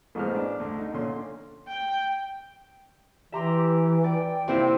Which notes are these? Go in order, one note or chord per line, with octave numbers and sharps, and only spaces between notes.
A1 B2 G#3 C5 F6
D4
D2
D#4
A#2 D3 C#4 C6
G5
E3 G4 E5 A#5 C6
D5 G5
C3 A#3 C4 E4 C5 E5